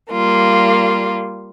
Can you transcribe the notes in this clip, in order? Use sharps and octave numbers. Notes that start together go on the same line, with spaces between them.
G3 A#3 F4